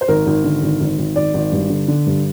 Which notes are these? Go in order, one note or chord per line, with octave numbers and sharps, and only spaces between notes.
C5
G#1 A#4
G#1
D3
G#1
G#1
G#1
G#1 D5
G#1
G2
D3
D3
G2